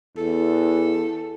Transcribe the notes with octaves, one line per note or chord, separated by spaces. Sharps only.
E2 A4